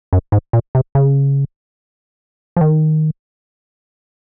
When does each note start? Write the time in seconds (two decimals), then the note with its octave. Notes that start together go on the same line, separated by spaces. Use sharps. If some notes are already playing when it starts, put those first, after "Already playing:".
0.13 F#2
0.32 G#2
0.53 A#2
0.75 C3
0.95 C#3
2.57 F3
2.61 D#3